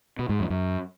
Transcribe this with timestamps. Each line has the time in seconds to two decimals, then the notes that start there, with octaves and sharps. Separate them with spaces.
0.19 B2
0.29 G#2
0.40 F2
0.50 F#2